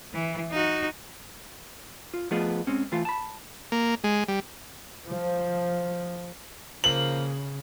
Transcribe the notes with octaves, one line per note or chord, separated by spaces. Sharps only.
E3
D#4 F#4
F4
F3 A3 B3 F4 G#4 D#5
G#3 C4 C#4
E3 A3 F4
A5 B5
A#3
G#3
G3
F3
C#3 F3 A#3 F#7